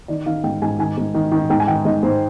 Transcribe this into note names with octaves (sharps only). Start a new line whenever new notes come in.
D#3 D5
D#3 F5
G#2 G5
G#2 G#5
D#3 G#5
G#2
D#3
D#3
G#2 G5
G#5
D#3 G5
G#2 D#5
G#2 C5